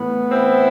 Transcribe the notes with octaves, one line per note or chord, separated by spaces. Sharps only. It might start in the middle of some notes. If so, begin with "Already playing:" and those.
Already playing: A2 E3 B3
C4 E4